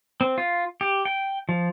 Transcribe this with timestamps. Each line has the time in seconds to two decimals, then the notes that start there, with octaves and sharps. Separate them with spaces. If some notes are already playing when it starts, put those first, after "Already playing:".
0.21 C4
0.38 F4
0.81 G4
1.05 G5
1.49 F3